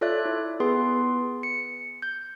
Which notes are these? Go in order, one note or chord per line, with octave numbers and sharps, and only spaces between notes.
F4 A4 C#5 D5 E5 F#6
E4
B3 G#4 B4 C6
C#7
G6